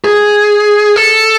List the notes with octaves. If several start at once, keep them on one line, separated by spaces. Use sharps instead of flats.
G#4
A4